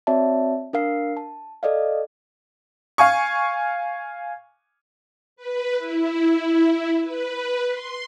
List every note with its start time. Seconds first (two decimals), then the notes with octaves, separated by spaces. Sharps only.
0.07 C4 F#4 C#5 D5 E5 A5
0.73 D4 A#4 F5 C7
1.17 A5
1.63 A4 D5 D#5 F5
2.98 F5 G#5 C#6
5.36 B4
5.77 E4
7.01 B4
7.70 C6